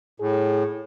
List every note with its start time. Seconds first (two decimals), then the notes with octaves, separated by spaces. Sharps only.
0.20 A2 G#4